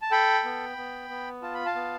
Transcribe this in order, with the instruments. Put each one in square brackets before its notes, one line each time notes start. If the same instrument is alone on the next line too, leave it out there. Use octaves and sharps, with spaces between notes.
[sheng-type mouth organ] A5
A4 G5 B5
B3
B3
B3
F4 A5
B5
F5 A5
B3